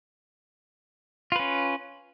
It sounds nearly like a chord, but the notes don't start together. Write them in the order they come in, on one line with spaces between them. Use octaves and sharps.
F4 B4 C#4